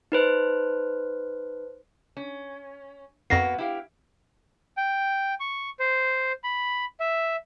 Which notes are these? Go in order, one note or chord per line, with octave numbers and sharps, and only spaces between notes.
D#4 B4 C5
C#4
F2 A#3 B3 F#4 A#6 C7
E4 G4 F5
G5
C#6
C5
B5
E5